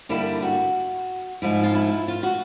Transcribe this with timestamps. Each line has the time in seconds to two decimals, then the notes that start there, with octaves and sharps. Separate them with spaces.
0.09 G2 D3 G3 A#3 E4
0.42 F#4
1.42 G#2 F3 G#3 E4
1.63 F4
1.75 E4
2.08 F4
2.23 F#4